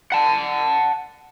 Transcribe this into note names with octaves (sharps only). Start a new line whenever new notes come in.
F#5 A5